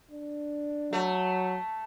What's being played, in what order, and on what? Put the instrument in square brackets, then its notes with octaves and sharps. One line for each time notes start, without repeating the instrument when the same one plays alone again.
[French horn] D4
[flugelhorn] F#3 [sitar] A3